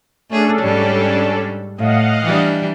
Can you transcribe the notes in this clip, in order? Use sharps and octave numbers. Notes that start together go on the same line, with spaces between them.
A3 C#4 D4 G#4 A4
G#2 G3
A2 D#5 F5 F#5
E3 G3 D4